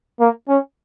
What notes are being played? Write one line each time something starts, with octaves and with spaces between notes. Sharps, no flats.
A#3
C#4